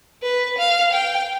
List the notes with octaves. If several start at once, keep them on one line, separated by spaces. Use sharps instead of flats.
B4
F5
G5